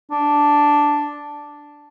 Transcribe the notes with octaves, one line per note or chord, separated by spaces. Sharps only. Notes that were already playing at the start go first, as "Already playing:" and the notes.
D4